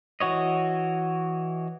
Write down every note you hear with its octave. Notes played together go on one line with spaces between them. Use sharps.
E3 F#4 C#5 D#5